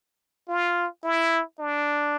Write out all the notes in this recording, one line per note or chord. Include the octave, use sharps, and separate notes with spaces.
F4
E4
D4